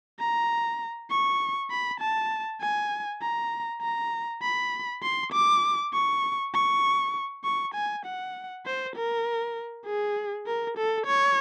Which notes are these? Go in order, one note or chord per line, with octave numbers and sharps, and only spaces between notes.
A#5
C#6
B5
A5
G#5
A#5
A#5
B5
C6
D6
C#6
C#6
C#6
G#5
F#5
C5
A#4
G#4
A#4
A4
C#5